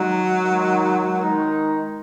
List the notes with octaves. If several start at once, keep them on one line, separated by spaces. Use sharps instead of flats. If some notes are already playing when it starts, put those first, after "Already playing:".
Already playing: D#3 F#3 G#3 D#4
D#3 G#3 D#4
D#3 G#3 D#4